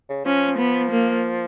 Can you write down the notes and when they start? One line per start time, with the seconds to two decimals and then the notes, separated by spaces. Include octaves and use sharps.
0.09 C#3
0.25 F3 C#4
0.58 B3
0.91 A#3